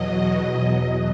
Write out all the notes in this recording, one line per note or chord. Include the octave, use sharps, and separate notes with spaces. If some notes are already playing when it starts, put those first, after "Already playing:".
Already playing: E2 B2 F#3 D#5